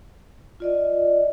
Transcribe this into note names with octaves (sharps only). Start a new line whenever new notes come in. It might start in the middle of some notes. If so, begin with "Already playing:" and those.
F4 D5 D#5